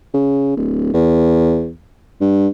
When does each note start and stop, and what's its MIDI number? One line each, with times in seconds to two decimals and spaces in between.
0.14 0.53 49
0.56 0.89 26
0.94 1.71 40
2.21 2.48 43